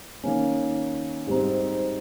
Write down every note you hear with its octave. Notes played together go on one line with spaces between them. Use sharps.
D#3 A#3 C#4
G#2 G3 C4 D#4